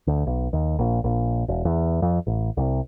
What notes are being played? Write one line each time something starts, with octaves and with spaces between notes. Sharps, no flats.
D2
B1
D#2
A#1
A#1
E1
E2
F2
A1
C2